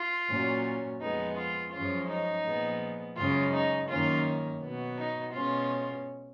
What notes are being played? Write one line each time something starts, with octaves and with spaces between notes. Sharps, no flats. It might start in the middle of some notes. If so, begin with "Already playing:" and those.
Already playing: F4
A#2 F#3 C#4
F2 F3 G#3 B3 D#4
F4
F#2 F3 G#3 C#4 F4
D#4
A#2 F3 G#3 B3
F#2 C#3 G#3 C#4 F4
D#4
F#2 D#3 A#3 C#4 F4
B2 F#3 B3
D#4
B2 G#3 C#4 F4